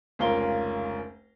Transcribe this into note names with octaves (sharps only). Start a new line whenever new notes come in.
F1 C#2 C#4 F4 A#4 G7